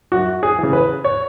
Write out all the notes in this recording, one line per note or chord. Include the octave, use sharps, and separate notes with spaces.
F#2 F#4
G#4
C#3 E3
B4
C#5